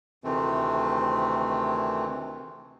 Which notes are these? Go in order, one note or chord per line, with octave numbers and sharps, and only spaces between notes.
D2 C3 D#3 E3 A3 C4